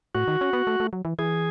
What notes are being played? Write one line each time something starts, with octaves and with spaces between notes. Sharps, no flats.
A2 F#4
D#3
C#4
B3
A3
A3
F#3
E3
E3 G#4